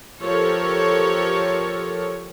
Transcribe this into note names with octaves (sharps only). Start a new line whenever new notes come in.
F3 G4 A4 A#4 C#5